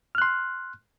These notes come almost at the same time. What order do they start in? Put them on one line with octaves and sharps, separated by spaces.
F6 F#6 C6